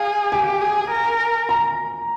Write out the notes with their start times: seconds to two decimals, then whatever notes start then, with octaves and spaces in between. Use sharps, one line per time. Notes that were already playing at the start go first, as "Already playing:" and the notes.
Already playing: G#4 F5
0.32 G4 G#5
0.62 G#4
0.91 A#4
1.49 A#5